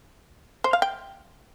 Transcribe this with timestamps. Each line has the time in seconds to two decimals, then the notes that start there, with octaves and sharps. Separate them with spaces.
0.64 C5
0.73 F5
0.82 G5